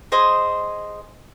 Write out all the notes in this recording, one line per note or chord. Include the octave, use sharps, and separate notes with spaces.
G#4 C5 D#5